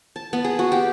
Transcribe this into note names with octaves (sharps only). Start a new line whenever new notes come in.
A5
B3
G#4
F#4
G4